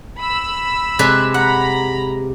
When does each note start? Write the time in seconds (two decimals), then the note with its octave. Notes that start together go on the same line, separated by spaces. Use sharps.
0.19 B5 E6
0.99 C3 G#3 B4
1.34 F#5 A#5 B5